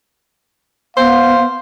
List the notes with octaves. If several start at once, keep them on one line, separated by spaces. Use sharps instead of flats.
B3 C5 F5